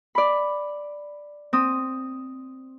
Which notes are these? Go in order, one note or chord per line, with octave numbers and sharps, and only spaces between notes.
D5 B5
C4 D#6